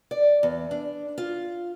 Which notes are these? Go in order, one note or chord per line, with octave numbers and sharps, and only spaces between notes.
D5
E2
D4
F4